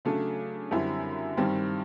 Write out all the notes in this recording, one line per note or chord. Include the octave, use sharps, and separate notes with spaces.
C#3 F#3 A3 D4
F#2 D3 G3 C4 E4
G2 D#3 G3 C4